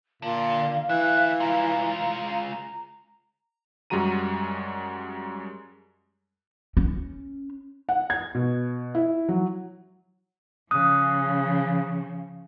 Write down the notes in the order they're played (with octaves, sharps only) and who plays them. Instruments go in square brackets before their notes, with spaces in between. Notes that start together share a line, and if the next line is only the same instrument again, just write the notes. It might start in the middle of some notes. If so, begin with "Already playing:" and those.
[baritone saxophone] A#2 [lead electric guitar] D3 [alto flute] F5
[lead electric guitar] D2 E5 [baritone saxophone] E3 [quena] F#6
[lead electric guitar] G#3 F4 [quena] A#5
[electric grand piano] F#2 G3 G#3 F#4 A#5 D#7
[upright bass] C#4
[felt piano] F#5
G#6
B2
E4
F#3
[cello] C#3 F3 [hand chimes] D#6 F#6